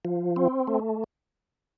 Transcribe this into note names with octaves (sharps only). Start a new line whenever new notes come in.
F3
C4
A3